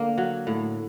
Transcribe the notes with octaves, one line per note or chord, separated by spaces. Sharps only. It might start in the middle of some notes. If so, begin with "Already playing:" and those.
Already playing: D3 A#3
F#3
A2